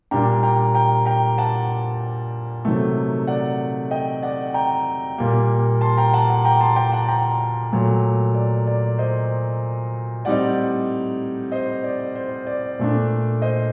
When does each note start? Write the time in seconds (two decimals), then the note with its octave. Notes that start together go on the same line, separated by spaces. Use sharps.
0.11 A#2 G3 A#3 D4 G5 A#5
0.43 G5 A#5
0.74 G5 A#5
1.06 G5 A#5
1.38 F#5 A5
2.65 C3 D#3 F#3 A3
3.27 D5 F#5
3.91 D#5 G5
4.23 D5 F#5
4.54 G5 A#5
5.18 A#2 G3 A#3
5.81 A5 C6
5.97 G5 A#5
6.13 F#5 A5
6.30 F#5 A5
6.45 G5 A#5
6.61 A5 C6
6.76 G5 A#5
6.92 F#5 A5
7.08 G5 A#5
7.72 A#2 F#3 A3
8.35 D5
8.67 D5
8.98 C5 D#5
10.25 A2 G3 C4 D#4 D5 F#5
11.52 C5 D#5
11.84 D5
12.16 C5
12.47 D5
12.79 A#2 A3 D4
13.42 C5 D#5